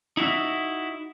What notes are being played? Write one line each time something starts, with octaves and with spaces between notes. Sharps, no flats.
D#4 E4 F#4 E5